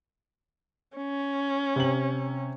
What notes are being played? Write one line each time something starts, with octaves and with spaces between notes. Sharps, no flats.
C#4
C3 F#7